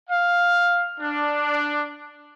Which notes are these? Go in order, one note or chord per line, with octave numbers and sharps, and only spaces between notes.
F5
D4